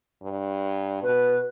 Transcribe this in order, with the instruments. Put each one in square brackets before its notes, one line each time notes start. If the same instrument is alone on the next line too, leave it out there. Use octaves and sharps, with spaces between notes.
[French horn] G2
[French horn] B2 [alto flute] B4